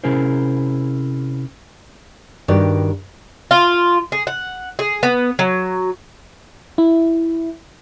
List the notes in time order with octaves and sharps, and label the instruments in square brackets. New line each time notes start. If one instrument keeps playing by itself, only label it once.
[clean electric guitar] C3 C#4 E4 G#4 A#4 C5
[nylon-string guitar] G2 D#3 F#4 G4 D5
[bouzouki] F4
G#4
F#5
G#4
B3
F#3
[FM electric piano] E4